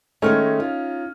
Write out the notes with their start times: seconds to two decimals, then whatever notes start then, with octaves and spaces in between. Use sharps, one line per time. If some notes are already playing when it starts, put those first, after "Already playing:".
0.22 D#3 G#3 A3 C#4 D#4 F6
0.60 F4